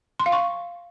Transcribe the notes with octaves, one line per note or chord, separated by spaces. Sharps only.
C6
F5
C#6